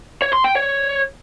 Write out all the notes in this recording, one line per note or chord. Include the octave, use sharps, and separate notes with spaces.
C#5
C6
G5
C#5